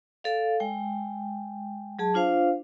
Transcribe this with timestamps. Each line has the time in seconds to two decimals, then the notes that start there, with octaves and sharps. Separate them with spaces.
0.24 A4 D5 F5
0.60 G#3 G5
1.99 F#3 G#4 A5
2.14 D4 F4 C5 F5